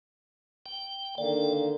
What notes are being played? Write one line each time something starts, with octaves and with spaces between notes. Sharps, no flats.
G5
D3 D#3 A#3 D5